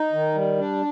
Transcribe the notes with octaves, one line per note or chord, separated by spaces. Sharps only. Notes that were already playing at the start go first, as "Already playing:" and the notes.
Already playing: D#4
D#3
G3
D4